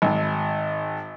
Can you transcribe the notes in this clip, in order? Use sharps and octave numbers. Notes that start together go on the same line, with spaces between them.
G#1